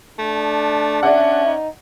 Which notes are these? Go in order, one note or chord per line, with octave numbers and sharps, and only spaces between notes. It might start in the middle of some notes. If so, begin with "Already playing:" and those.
A3 D4
C#4 D5 E5 F#5
D#4